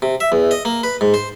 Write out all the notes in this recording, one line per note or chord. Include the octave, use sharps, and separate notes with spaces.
C3
E5
E2
D#5
A#3
B4
G#2
C5